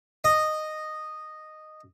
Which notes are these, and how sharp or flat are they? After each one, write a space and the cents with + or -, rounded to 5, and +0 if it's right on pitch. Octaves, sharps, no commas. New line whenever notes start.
D#5 -10